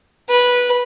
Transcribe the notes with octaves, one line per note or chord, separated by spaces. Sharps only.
B4